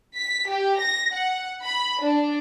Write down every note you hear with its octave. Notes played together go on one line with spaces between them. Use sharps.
B6
G4
A#6
F#5
B5
D4